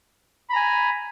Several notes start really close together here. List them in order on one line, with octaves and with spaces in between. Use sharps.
B5 A#5 G#5